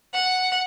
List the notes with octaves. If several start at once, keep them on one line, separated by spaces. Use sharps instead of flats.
F#5